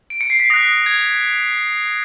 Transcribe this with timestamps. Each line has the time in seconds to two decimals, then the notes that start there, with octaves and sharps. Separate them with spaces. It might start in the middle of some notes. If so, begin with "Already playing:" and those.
0.10 D7
0.21 C#7
0.30 C7
0.39 B6
0.50 D#6 F#6 A#6
0.86 G#6